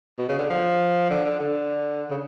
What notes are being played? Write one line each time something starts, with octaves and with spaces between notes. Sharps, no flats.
B2
C#3
D3
F3
D3
D3
D3
C#3